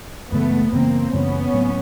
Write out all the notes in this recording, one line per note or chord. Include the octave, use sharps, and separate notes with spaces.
F#2 C#3 E3 G#3 A3 B3
F#2 C#3 E3 G#3 A#3 C4
F#2 C#3 E3 G#3 B3 C#4
A2 F#3 A3 C4